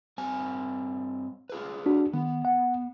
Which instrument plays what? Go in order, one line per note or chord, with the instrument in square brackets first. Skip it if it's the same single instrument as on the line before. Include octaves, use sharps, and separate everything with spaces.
[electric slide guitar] G2 C4 G#5
F4 G#4 B4
[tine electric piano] D4 F#4
[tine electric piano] D#3 [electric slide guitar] B3
[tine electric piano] F#5